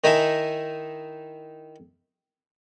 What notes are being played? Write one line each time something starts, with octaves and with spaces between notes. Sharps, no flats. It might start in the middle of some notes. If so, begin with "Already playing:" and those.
D#3 D#4 E4 G#5